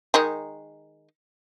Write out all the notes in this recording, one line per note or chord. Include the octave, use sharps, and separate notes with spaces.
D#3 G#3 D#4